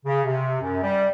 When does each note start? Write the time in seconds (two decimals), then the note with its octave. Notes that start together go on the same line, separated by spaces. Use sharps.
0.06 C#3
0.26 C3
0.61 F#2
0.83 G3